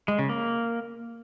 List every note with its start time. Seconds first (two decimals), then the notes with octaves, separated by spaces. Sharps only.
0.08 G#3
0.19 C#3
0.29 A#3